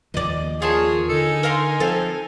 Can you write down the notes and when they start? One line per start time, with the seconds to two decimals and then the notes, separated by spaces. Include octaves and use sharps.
0.14 D#2 D#3 F3 D5 D#5
0.62 F4 G#4 A#4 C#5 A5
1.09 D3 D#4 A4 G#5
1.43 A#4 F5 C6
1.80 F3 C4 A4 F5